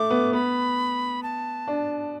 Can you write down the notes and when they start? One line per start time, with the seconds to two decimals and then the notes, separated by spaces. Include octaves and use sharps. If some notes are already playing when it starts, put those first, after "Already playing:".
Already playing: A3 D6
0.10 B3
0.33 B3 B5
1.23 A5
1.67 D4